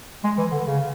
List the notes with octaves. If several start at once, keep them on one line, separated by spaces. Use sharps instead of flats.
G#3
E3
D3
C#3